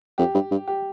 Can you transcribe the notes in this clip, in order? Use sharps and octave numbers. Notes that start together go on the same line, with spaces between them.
F2 G4
G2
G2
G4